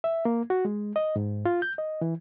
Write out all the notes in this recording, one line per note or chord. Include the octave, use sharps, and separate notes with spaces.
E5
A#3
F#4
G#3
D#5
G#2
F4
G6
D#5
E3